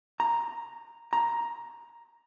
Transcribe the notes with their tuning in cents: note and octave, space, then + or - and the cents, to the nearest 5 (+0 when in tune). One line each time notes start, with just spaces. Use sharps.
A#5 -5
A#5 +10